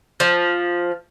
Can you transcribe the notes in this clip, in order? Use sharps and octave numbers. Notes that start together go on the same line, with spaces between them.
F3